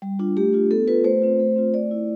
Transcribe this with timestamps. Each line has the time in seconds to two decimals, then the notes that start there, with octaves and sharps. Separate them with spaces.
0.02 G3
0.19 D4 F4
0.37 A3 G4
0.53 D4 F4
0.71 B3 A4
0.87 F4 B4
1.04 A3 C5
1.22 C4 F4
1.40 A3
1.56 C4 F4
1.74 A3 D5
1.91 E4